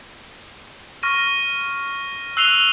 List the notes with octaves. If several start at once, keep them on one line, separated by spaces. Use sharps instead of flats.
C#6 F6 A#6 D#7
E6 F#6 C7 D#7 F7 G7